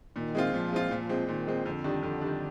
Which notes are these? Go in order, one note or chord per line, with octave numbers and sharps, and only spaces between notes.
A#2 D#3
G#3 C4 F4
A#2 F3
G#3 C4 F4
A#2 F3
G#3 C4
A#2 D#3
G#3 C4
F2 D3
D#3 G3 D4
F2 D3
D#3 G3 D4